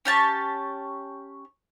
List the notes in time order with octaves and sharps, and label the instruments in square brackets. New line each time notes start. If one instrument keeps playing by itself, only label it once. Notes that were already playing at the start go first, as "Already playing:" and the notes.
[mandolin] C#4 G4 A5 C#6